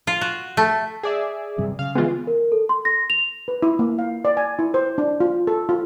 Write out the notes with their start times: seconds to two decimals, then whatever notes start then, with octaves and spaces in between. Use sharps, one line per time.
0.07 F4
0.21 F#4
0.57 A3
1.03 G#4 D5 E5
1.58 G2 C3 F#3
1.79 C#3 F5
1.95 E3 G#3 B3 F4
2.27 A#4
2.52 A4
2.69 C6
2.85 A#6
3.10 F7
3.48 B4
3.63 E4
3.79 A#3
3.99 F5
4.25 D5
4.37 G#5
4.59 E4
4.74 C5
4.98 D4
5.20 F4
5.47 A4
5.69 F4